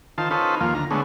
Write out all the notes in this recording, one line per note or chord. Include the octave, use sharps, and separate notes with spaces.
D#3 F4 C5 A5
C#4 D#4 F4 A4 B4 C5
D#2 F3 A#3 F4
D2 A#5
D3 G#3 A3 B3 C#4